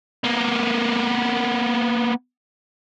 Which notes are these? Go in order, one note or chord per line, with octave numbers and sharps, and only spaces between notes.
A#3 B3